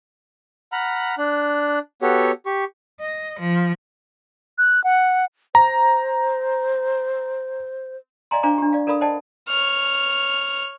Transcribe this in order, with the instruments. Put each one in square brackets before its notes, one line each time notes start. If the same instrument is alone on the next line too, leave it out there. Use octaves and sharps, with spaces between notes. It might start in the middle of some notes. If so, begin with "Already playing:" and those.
[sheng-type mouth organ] F#5 A#5 B5 F6
D4 F#6
B3 F#4 G4 A4 C#5
G4 C#6
[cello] D#5
F3
[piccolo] F#6
F#5
[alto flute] C5 [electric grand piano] A#5
[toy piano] D5 D#5 F5 G#5 A#5 C6
D4 C5 F5 G#5 A#5 D6
D4 G4
D5 F5
A4 A#4 D5 F5 B5 D#6
C5 D5 D#5 F#5 G5 A5
[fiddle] C#5 F6